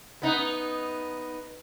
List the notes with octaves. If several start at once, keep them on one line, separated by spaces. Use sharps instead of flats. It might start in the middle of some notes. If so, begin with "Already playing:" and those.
B3 D#4